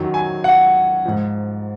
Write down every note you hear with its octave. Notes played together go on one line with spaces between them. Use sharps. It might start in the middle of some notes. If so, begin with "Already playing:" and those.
Already playing: F#2 D#3 F#3
G#5
F#5
G#2 F3